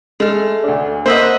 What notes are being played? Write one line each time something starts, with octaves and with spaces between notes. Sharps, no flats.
G#3 A3 F6
D2 D4
A#3 B4 C5 D#5 E5 F#5